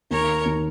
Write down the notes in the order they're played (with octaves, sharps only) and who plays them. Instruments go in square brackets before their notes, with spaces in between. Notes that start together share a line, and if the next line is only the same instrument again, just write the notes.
[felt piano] D#2 [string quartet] A#4 C#5
[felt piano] D#2